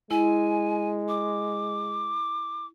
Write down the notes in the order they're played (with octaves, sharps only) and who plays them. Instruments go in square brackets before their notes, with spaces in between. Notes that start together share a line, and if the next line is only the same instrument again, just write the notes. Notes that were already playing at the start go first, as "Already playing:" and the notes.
[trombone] G#3 [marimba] E4 [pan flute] G#5
[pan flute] D6